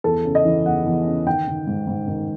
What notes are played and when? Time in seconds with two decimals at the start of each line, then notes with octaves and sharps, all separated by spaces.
0.04 E2 A4
0.25 C#3
0.35 D#5
0.45 E3
0.66 E2 F#5
0.86 E2
1.06 C#3
1.26 D#3 G5
1.48 D#3
1.67 G#2
1.87 G#2
2.08 D#3